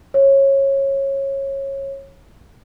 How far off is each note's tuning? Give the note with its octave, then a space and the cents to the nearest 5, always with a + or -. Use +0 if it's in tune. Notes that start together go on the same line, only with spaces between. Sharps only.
C#5 -20